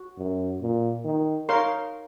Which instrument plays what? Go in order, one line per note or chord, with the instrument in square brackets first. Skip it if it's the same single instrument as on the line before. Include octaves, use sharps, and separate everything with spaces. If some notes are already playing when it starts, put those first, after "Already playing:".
Already playing: [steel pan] F#4
[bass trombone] F#2
A#2
D#3
[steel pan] D#4 A#4 C#5 F5 C6